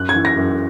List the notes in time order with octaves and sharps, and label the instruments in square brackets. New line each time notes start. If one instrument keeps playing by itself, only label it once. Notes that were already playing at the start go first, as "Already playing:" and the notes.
Already playing: [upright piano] F#2 F#6
G#6
E3
A#6
F#2